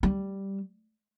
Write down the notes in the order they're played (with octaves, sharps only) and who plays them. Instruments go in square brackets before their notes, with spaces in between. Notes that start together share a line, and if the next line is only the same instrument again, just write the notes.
[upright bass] G3